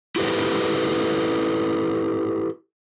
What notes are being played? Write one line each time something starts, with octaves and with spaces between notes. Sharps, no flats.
E4 F#4 G4 A4 B4 C5